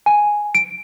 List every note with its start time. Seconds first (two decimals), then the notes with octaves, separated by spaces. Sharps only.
0.06 G#5
0.55 D7